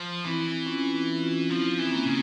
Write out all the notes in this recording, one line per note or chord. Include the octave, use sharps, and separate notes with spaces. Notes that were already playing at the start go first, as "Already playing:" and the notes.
Already playing: F3
E3 C4 E4
C#4 F4
C4 E4
E4
C#4 F4
F3 C4 E4
E3
C4
A#3 C#4
C#3